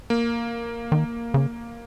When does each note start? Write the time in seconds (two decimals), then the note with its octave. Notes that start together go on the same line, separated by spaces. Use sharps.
0.10 A#3
0.92 D#3
1.34 C#3